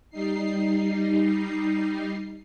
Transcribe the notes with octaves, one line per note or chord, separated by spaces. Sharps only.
G3 D#4 C7